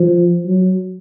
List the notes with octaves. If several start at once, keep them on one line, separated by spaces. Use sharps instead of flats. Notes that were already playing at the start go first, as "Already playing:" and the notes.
Already playing: F3
F#3